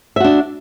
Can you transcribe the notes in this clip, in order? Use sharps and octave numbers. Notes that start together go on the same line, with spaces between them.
D4 F#4 E5